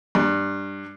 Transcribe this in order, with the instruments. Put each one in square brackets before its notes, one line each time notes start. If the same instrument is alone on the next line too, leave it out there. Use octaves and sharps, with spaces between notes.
[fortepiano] G2